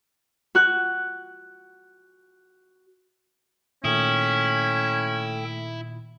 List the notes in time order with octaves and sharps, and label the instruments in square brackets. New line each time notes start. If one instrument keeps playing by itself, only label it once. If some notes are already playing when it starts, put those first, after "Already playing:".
[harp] F#4 F#6
[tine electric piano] A#2 D#3 D#6 [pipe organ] A3 A4 G5 [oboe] C#4 [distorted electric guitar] E4